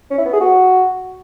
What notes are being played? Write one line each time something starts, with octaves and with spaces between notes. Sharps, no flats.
C#4
E4
B3
G#4
F#4